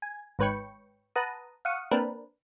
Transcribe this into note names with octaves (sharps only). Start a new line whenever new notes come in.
G#5
G#1 G#2 B4 C#5 G5 C#6
B4 F#5 A5 A#5 D#6
F5 F#5 C#6 D#6
A#3 C4 D4 A#4 B4